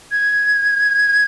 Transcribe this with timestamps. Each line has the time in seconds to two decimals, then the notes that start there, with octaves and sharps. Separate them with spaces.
0.12 G#6